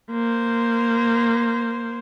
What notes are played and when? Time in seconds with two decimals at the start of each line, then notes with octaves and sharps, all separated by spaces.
0.11 A#3 C5